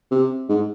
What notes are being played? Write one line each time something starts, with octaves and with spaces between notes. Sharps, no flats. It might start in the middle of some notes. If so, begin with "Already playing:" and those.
C3
G#2